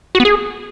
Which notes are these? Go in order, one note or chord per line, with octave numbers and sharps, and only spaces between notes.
F#4
B3
G#4